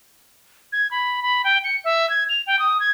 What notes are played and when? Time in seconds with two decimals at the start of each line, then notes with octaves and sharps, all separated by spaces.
0.72 G#6
0.91 B5
1.23 B5
1.44 G5
1.64 C#7
1.84 E5
2.10 G#6
2.29 F7
2.47 G5
2.59 D#6
2.80 G#6